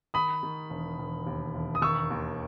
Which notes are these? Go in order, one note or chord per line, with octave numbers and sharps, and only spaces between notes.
D#3 B5 D#6
D#3
E1
E1
D#2
E1
D#6
D#3 C#6 E6
D#2